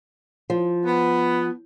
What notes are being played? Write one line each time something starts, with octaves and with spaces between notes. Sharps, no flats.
F3
B3